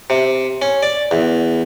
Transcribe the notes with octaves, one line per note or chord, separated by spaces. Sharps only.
C3
C#4
D5
E2